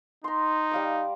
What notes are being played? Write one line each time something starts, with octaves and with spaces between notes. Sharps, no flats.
D#4 A#5 C6
G3 F5 D6